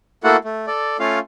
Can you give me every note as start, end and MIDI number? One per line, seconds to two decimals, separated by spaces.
0.24 0.36 57
0.24 0.36 58
0.24 0.36 64
0.24 0.36 66
0.24 0.36 69
0.24 0.36 78
0.44 0.66 57
0.67 0.97 69
0.67 0.97 74
0.99 1.19 57
0.99 1.19 61
0.99 1.19 65
0.99 1.19 77